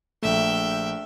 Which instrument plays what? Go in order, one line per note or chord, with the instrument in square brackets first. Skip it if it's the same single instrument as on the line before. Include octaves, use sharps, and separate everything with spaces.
[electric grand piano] A#1 A3 [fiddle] E5 G5